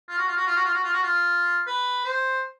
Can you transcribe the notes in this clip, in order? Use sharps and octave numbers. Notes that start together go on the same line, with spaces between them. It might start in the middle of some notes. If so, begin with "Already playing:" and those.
F4
F#4
F4
F#4
F4
F#4
F4
F#4
F4
F#4
F4
B4
C5